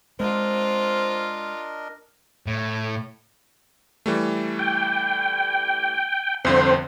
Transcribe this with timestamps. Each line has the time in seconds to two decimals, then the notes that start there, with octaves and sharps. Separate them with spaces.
0.20 G#3 C4 D4 F4 A#4 D#5
2.47 A2
4.06 E3 G3 A3
4.59 G5
6.45 C2 F2 D3 C4 C5